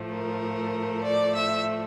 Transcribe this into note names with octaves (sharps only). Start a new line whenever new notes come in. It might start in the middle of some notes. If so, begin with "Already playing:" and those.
Already playing: A2 F3 A3
A#4
D5
E5